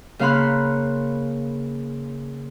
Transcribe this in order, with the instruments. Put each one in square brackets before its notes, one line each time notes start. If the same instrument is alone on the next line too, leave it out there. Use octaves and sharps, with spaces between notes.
[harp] C#3 A#3 F5 B5 C6 F#6